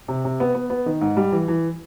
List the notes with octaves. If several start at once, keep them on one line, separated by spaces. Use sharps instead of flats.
C3
C3
B3
B3
B3
D#3
G#2
G3
E3
E3